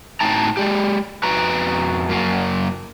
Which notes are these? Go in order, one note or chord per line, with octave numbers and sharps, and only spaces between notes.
A2 D#4 G5 A5 A#5
G#3 G4
F2 B3 F#4 B4 A#5
F#2 A#3